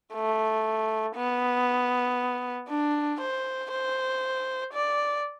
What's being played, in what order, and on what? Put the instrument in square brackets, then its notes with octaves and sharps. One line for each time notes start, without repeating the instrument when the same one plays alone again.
[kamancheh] A3
B3
D4
C5
C5
D5